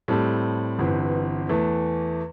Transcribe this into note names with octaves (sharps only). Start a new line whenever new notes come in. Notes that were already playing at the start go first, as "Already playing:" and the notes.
A2 G3 C4 A4
G1 G2 E3 C4
E2 E3 A3